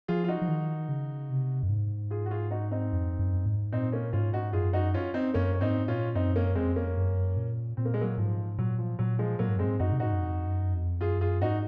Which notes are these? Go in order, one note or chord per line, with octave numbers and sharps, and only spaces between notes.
F3 F4 G#4
F4
D#4 F#4
F3
D#3
C#3
C3
F#2
G#2
F4 G#4
F#4
F4 G#4
D#4 F#4
C4 D#4
F2
F#2
G#2
A#2 C4 D#4
A#3 C#4
G#2 C#4 F4
D#4 F#4
F#2 F4 G#4
D#4 F#4
C#4 F4
C4 D#4
F#2 A#3 C#4
C#4
G#2 C4 D#4
A#2 C#4 F4
F#2 C4 D#4
A#3 C#4
F2 G#3 C4
A#3 C#4
F#2
A#2
A#2 C4
A#3
G#3
F#3 A#3
G#2 F3
A#2 F#3
F3
A#2 F#3
F3 G#3
A#2 F#3 A#3
G#2
F#2 G#3 C4
G#2
F#2 D#4 F#4
C3
A#2 D#4 F#4
G#2
F#2
F2
F#2
F2
F#2 F4 G#4
F4 G#4
G#2 D#4 F#4